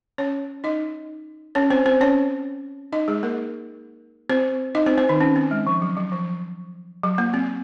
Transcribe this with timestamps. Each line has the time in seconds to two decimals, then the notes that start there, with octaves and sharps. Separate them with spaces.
0.18 C#4 C#5
0.64 D#4 D#5
1.55 C#4 C#5
1.70 C4 C5
1.86 C4 C5
2.01 C#4 C#5
2.92 D#4 D#5
3.08 G#3 G#4
3.23 A#3 A#4
4.30 C4 C5
4.75 D#4 D#5
4.86 C4 C5
4.97 C4 C5
5.09 D#3 D#4
5.21 C#4
5.36 C4
5.51 G#3
5.67 F3
5.82 F#3
5.97 F#3
6.12 F3
7.03 F#3
7.18 A#3
7.34 C4